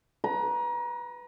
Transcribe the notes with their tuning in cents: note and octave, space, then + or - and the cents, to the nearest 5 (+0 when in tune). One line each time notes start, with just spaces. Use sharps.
B4 +0 A#5 +30